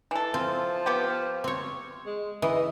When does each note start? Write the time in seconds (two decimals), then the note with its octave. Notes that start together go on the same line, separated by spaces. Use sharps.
0.11 E3 A4
0.34 F3 C4
0.86 B3 G4
1.44 C4 C#5
2.06 G#3
2.42 E3 D#5